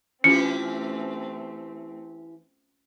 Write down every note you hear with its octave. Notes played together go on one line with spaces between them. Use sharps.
E3 A3 C4 C#4 F4 G4 C#7